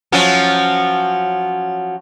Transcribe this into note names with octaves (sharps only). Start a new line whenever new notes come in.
F3 F#3 C#4